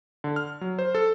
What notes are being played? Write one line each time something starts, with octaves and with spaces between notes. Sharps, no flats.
D3
F6
F#3
C5
A4